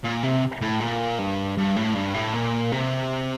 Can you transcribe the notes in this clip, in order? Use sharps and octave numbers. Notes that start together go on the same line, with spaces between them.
A#2
C3
A2
A#2
G2
G2
A2
G2
A2
A#2
C3